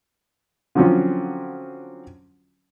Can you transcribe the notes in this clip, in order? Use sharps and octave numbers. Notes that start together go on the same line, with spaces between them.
D3 F3 F#3 C4 C#4 F4